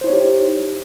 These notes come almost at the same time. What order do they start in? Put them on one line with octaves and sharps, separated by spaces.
C5 E4 C#5 D#4 G4